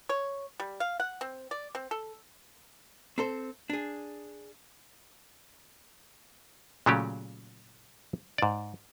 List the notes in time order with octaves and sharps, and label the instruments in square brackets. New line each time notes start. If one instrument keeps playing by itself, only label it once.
[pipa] C#5
G3
F5
F#5
C4
D5
C4
A4
[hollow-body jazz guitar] C4 A4 C5
D4 G#4
[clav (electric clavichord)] A#2 C#3 F#3 A3 C#4 G4
G#2 D5